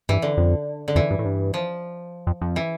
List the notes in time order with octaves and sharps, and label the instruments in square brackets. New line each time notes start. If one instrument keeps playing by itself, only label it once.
[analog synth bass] G2 [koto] E3
[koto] D3
[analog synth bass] F2
[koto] D3
[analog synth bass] F2 [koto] E3
[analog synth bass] G2
A2
G2
[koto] F3
[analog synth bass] F2
F2
[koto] E3